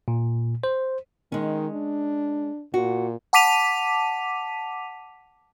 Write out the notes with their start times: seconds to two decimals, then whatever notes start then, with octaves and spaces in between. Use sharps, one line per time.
0.08 A#2
0.64 C5
1.32 D#3 G#3 C#4
1.73 D4
2.74 A#2 F#4
3.33 F#5 A5 D6 B6 D#7 F7